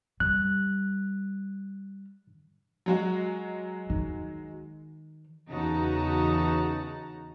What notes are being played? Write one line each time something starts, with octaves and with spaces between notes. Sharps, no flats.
G3 F#6
F#3 G#3 F#4
D#3
E2 C#3 D#4 F#4 A5 A#5